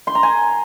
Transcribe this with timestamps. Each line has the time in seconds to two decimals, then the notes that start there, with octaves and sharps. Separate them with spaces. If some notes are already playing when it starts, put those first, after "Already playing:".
0.07 C6
0.15 A#5
0.23 G#5